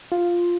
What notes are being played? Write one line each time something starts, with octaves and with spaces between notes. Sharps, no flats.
F4